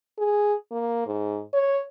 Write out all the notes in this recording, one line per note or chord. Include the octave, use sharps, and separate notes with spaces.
G#4
A#3
G#2
C#5